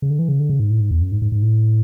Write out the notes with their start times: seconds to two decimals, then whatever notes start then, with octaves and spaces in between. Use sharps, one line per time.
0.02 C#3
0.10 D3
0.19 E3
0.29 C#3
0.39 D3
0.49 C#3
0.60 G#2
0.71 A2
0.80 G#2
0.91 E2
1.02 F#2
1.12 G#2
1.22 G#2
1.32 G#2
1.42 A2